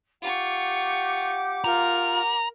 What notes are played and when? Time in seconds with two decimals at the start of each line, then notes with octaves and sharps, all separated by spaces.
0.22 F4 G4 F#5 C#6 D6
1.64 F4 A#4 A#5